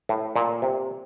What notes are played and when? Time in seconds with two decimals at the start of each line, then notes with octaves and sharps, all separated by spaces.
0.09 A2
0.36 A#2
0.62 C3